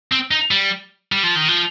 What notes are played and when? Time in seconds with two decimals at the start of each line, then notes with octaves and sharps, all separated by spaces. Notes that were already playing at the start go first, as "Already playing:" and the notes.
0.12 C4
0.31 D#4
0.51 G3
1.12 G3
1.23 F3
1.36 D#3
1.48 F3